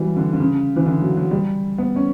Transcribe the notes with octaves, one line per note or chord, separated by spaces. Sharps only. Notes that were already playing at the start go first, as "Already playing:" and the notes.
Already playing: E3 F#3 G3
D3
D3
C#3
E3
D3
F#3
F#3
G3
B3
C#4